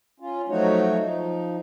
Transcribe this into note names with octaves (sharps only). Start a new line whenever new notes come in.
C#4 F4
F3 F#3 A3 D#4 F#4 C#5
F3 D#4